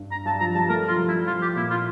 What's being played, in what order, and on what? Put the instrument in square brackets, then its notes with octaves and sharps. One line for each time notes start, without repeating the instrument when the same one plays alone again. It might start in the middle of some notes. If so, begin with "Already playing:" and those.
Already playing: [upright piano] G2
[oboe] A#5
[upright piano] G2 [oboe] A5
[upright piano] F3 [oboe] A#5
[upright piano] G3 [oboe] A5
[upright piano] A3 [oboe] A#4
[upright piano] F3 [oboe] F4
[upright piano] G3
[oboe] E4
[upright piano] F3 [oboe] F4
[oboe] G4
[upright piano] A#2 [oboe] E4
[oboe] F4